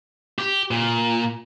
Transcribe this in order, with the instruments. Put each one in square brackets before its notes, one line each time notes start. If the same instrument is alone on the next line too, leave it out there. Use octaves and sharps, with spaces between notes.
[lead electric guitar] G4
A#2